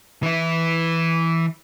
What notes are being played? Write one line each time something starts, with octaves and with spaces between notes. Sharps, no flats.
E3 E4